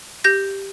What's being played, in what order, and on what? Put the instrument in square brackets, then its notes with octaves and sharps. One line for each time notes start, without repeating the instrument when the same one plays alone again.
[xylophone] G4 G6 A#6